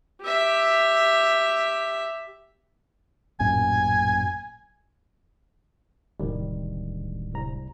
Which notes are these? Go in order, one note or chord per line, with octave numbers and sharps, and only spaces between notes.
G4 E5
A1 F#2 A#2 G#5
D1 C2 D#3 G3
C2 A#5